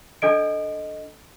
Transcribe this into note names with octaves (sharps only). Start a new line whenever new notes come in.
D4 A4 D#5 D7